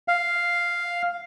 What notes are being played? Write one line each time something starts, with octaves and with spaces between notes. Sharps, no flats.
F5